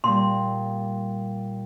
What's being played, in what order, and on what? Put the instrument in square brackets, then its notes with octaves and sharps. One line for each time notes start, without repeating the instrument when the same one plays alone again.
[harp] A#2 G3 [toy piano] C6